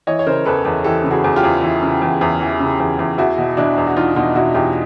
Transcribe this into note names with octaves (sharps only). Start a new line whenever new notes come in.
E3 C#5 D#5
C#5
C#3 A#4 C5
E2 A4 B4
E2
E3 G4 A4
C#3
F#4 G#4
E2
F4 G4
E2
E3
C#3
E2
E2
E3
C#3
E2
E2
E2 E4 F#4
B2
B2 D4 E4
E2
F#4
E2 D#4 F4
B2 D#4 F4
B2 E4 F#4
E2 F4 G4